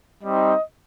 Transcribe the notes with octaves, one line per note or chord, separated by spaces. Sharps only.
G3 C4 D#4 D#5